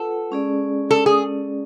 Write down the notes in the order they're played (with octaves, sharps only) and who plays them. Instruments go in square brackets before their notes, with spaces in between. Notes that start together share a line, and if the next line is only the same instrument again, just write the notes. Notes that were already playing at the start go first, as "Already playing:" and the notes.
Already playing: [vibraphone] F4 B4 F#5 [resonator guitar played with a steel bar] A4
[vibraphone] G#3 C#4 G#4 D5
[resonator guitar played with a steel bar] A4
G#4